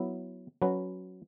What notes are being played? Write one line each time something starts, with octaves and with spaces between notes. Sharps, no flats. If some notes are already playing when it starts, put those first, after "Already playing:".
Already playing: F#3 B3 E4
F#3 C#4 F#4 B4